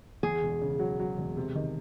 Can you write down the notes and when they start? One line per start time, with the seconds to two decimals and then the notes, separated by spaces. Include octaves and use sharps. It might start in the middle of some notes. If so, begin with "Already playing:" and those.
0.23 E2 G#4
0.42 E1
0.61 C#3
0.79 F#3
0.99 F#3
1.18 E1
1.37 C3
1.55 D#3